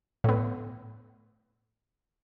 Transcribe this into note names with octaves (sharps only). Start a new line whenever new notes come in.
A2 B3